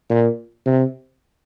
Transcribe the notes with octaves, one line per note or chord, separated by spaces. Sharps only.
A#2
C3